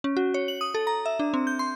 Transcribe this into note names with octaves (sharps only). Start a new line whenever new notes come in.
C#4
F#4
C#5
F#7
D#6
A4
A#5
E5
D4
C4
G6
C6